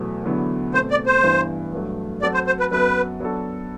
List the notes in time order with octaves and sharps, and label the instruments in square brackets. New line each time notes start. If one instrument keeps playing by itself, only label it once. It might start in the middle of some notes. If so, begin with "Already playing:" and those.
Already playing: [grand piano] E2 B2 F#3 A3
E2 D3 F#3 B3 E4
[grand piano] B2 A3 C4 [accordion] C5
[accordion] D5
C5
[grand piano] G2 E3 B3
G2 F#3 A3
[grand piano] F#3 C4 F#4 A4 [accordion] D5
[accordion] C5
C5
B4
[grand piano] F#2 F#3 B3 F#4 A4 [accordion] B4
[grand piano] F#3 B3 D4 F#4 A4